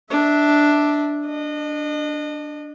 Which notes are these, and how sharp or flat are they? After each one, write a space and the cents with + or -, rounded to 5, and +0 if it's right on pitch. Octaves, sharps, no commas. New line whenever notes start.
D4 +0 E5 -25
D4 +0 D#5 -30